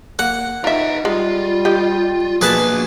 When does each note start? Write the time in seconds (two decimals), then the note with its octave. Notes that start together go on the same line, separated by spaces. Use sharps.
0.19 A#3 F#5
0.64 D#4 F4 B4 E5 A#5
1.05 G3 G#3 F4
1.65 G4 D#5
2.41 B2 F3 A#3 G#4 A#4 B4 A5